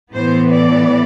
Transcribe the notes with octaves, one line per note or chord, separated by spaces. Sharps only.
A2 E3 B3 C5
D5